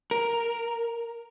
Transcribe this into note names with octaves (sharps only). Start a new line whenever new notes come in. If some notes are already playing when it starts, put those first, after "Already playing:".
A#4